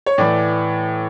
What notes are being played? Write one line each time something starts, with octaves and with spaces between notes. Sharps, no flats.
C#5
A2 E3 D5